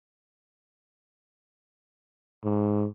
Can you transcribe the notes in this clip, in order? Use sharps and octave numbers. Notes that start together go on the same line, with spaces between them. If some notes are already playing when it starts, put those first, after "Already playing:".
G#2